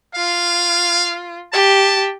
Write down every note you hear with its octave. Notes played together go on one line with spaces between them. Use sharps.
F4 F5
G4 A5